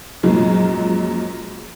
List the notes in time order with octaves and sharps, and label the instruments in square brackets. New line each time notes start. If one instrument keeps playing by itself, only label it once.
[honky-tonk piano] F#2 A#2 F3 F#3 G#3